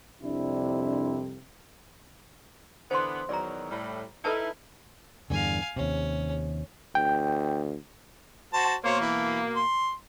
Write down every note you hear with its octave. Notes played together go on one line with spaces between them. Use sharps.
C2 F2 C3 D4 E4
D3 E3 B3 C5 C6
E2 D#3 F#3 D5 A#5
A2 G3
D#4 E4 A4 B4 A5
E2 G2 D3 F5 G#5
D#2 C3 C#4
D2 G5
F#4 C5 A5
B2 A#3 C5 C#5
E3
C6